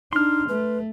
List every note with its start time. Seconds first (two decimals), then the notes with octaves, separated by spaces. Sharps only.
0.13 D4 D#4 C6 F6
0.49 A3 B4